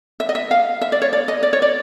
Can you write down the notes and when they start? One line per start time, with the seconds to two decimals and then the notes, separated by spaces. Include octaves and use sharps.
0.20 E5
0.29 D#5
0.35 E5
0.51 F5
0.81 E5
0.92 D5
1.02 C#5
1.13 D5
1.28 D#5
1.43 D5
1.53 C#5
1.62 D5